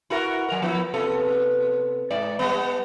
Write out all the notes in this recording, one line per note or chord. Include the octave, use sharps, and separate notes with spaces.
E4 F#4 A#4
F#3 A#4
F3 B3 E4
C3 B3 A4
G#2 D5
G3 B3